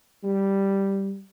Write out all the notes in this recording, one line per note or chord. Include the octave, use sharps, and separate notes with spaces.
G3